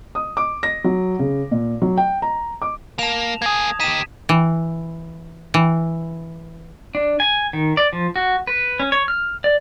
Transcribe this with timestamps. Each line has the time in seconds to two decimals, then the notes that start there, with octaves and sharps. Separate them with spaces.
0.15 D#6
0.37 D6
0.63 A#6
0.84 F#3
1.19 C#3
1.51 A#2
1.82 F#3
1.97 G5
2.22 A#5
2.62 D6
2.99 A#3 A5 E7 F7
3.42 A#3 G#4 D#6 G#6
3.80 D#4 G4 B6 D#7 E7
4.29 E3
5.54 E3
6.95 D4
7.20 G#5
7.53 D#3
7.77 D5
7.93 F3
8.16 F#4
8.47 B4
8.80 C#4
8.92 C#5
9.08 F6
9.44 D5